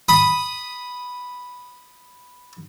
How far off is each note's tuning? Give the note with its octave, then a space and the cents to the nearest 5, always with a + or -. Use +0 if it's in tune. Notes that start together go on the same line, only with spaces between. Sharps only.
B5 +0 D#6 +0